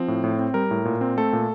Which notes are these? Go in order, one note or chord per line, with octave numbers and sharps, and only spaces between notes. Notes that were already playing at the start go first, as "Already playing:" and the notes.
Already playing: F3 C4
A2
A2
C4
G3 A#4
A2
A#2
C4
A3 A4
A#2